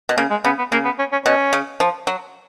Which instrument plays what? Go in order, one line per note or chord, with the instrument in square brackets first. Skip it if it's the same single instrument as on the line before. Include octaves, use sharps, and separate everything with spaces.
[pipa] B2
[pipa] C#3 [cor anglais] A#3
[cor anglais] G#3
[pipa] C#3 [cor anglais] B3
[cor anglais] B3
[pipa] C#3 [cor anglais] A#3
[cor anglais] B3
C#4
C#4
[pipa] B2 [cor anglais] C#4
[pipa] C#3
F3
F#3